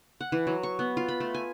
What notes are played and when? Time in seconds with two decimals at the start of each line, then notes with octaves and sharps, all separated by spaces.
0.21 F#5
0.32 E3
0.47 F#3
0.63 C#6
0.79 B3
0.97 F4
1.08 B5
1.20 A3
1.35 G#5